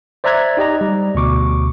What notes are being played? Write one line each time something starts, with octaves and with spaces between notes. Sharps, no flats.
C5 D5 E5 A#5 F#6 G#6
D#4 G4 D#5 A#5
G3
D2 B2 C#6 D6